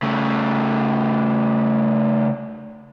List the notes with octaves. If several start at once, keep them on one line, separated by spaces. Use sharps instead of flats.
C#3 A3